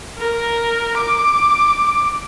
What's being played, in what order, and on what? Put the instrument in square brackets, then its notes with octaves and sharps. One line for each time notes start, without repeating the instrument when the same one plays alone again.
[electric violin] A#4
D6